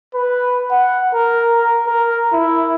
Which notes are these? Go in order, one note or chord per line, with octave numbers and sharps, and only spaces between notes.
B4
F#5
A#4
A#4
E4